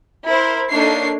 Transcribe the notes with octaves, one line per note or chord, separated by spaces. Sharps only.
E4 A#4 C5
A#3 D4 D#4 A4 C#5 C7